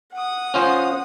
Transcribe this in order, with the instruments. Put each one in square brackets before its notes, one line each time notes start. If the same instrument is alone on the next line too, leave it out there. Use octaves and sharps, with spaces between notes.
[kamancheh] F#5 D#6
[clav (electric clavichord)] C#4 F4 C5